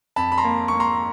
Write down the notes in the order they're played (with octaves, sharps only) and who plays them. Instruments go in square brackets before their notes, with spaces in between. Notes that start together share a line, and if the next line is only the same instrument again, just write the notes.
[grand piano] F2 A5 B5
B5
A#5 C6
A#3
A#3 C#6
A#5 C6